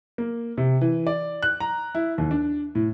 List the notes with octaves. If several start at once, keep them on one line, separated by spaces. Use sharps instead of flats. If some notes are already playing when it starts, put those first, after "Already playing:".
A#3
C3
E3
D5
F#6
A#5
E4
D#2
D4
A2